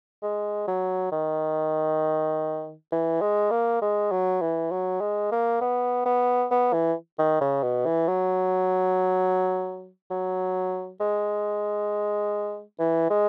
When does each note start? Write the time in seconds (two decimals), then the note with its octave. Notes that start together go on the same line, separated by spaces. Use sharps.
0.22 G#3
0.68 F#3
1.12 D#3
2.92 E3
3.21 G#3
3.51 A#3
3.82 G#3
4.12 F#3
4.41 E3
4.71 F#3
5.01 G#3
5.32 A#3
5.61 B3
6.06 B3
6.51 B3
6.73 E3
7.19 D#3
7.41 C#3
7.63 B2
7.86 E3
8.08 F#3
10.10 F#3
11.00 G#3
12.79 E3
13.10 G#3